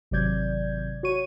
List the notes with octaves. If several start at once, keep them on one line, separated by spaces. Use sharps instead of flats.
G#1 C3 F#3 D5 G6 G#6
F#4 C#5 C#6 D#7